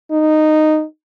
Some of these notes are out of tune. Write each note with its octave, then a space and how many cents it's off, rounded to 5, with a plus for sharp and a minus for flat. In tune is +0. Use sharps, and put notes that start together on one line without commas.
D#4 -10